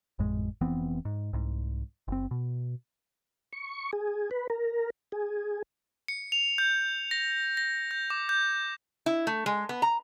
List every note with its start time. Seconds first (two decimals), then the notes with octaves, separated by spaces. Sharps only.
0.19 G#1 F2 A2 G#3
0.61 F1 E3 B3 C4
1.05 G#2
1.33 C2 G#2
2.08 F#1 C4
2.31 B2
3.53 C#6
3.93 G#4
4.31 B4
4.50 A#4
5.12 G#4
6.08 C#7
6.32 F7
6.58 G6
7.11 A#6
7.57 A#6
7.91 G6
8.10 D6
8.29 G6
9.06 E4
9.27 A3
9.46 G#3
9.69 B3
9.82 A#5